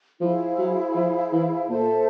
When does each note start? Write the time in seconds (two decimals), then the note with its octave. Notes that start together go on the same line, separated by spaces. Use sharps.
0.21 F3 E4 G#4 C5 F5
0.58 F#3
0.95 F3
1.32 E3
1.69 A#2 A4 C5 E5 A5